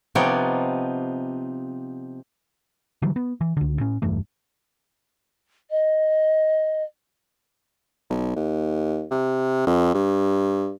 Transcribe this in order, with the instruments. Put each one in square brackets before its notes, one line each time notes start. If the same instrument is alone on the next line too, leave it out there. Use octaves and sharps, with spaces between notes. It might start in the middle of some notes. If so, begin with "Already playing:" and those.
[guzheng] C3 F3 B3 D#4 C#5 D5
[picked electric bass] D3 E3 F#3 G3
B3
E3
C#2 D3
A2 C#4
E1 G2 E3 A3
[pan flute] D#5
[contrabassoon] B1
D#2
C3
F2
G2